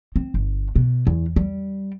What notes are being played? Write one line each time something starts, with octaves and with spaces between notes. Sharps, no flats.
C4
G1
B2
E2
G3